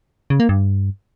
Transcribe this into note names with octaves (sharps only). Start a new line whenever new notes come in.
C#3
A#3
G2